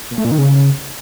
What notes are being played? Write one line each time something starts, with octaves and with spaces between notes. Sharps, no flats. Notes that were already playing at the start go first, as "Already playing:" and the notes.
A#2
A3
A#2
D#3
C#3